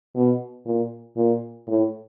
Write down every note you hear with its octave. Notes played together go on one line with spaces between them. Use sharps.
B2
A#2
A#2
A2